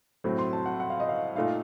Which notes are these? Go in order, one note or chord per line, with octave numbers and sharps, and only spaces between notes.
A2 F#3 A3 C4
C6
A5
F#5
F#5
F5
D#5
F5
A#2 A3 D#4 F5